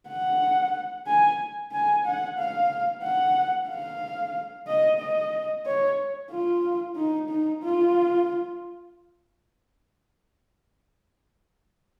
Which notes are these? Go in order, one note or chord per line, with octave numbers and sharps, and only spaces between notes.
F#5
G#5
G#5
F#5
F5
F#5
F5
D#5
D#5
C#5
F4
D#4
D#4
F4